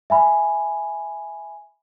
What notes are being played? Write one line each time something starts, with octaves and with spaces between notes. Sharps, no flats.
E5 G#5 B5